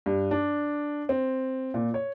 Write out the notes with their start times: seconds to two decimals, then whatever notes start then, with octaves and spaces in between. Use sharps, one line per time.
0.06 G2
0.31 D4
1.09 C4
1.74 A#2
1.94 C#5